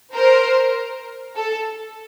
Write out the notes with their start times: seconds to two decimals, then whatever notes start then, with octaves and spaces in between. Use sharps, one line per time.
0.13 A#4 C5
1.36 A4